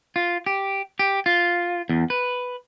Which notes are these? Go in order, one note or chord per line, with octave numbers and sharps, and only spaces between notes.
F4
G4
G4
F4
E2
B4